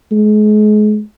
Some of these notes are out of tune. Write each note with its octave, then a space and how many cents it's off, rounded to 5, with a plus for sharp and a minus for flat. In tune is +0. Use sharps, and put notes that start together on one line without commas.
G#3 +35